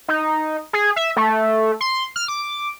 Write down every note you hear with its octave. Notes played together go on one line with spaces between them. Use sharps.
D#4
G#4
E5
A3
C6
F6
D6